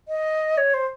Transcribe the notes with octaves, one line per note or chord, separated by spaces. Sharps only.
D#5
C#5
C5